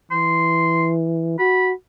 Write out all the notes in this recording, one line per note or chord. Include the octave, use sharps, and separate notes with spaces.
E3 C6
F#4 B5